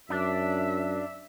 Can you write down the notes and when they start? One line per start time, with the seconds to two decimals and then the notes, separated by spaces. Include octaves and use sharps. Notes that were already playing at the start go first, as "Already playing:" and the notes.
0.10 F#2 D4 E5